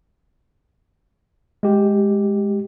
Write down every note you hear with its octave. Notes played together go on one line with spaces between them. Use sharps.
G#3 G4